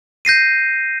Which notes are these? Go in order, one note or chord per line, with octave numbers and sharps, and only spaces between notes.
G6 A#6 C7 D#7